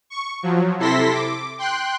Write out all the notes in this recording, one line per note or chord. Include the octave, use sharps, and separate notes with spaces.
C#6
F3 F#3
C3 E4 A4 C6 A#6 B6
D6
G5 C6 F#6